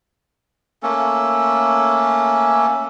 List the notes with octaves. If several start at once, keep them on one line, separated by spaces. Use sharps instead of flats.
A3 A#3 C#4 A4